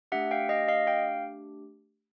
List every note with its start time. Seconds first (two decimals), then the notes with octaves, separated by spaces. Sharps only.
0.12 A3 D4 G4 E5 F#5
0.31 F5 G5
0.49 D#5 F5
0.68 D#5 F5
0.87 F5 G5